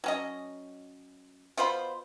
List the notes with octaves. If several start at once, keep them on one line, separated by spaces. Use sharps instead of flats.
F#3 C#4 D#5
B2 F4 C5 B5